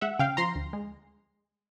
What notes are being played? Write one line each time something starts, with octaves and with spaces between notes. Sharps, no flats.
G#3 E5 F#5
C#3 F5 G5
F3 A#5 C6
D2
G#3